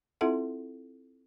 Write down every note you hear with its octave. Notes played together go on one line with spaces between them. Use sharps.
C4 E4 F4 A4 E5 F#5